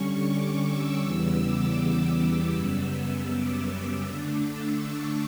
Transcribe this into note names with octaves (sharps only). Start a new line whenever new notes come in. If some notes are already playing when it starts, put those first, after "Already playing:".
Already playing: D3 G3 C#4 C#6
D6
E6
E2 C#3 E3 G3 B3
D6
D6
D6
F#2 C#3 G3 B3 E6
D6
D3 A3 D4 D6
E6
C#6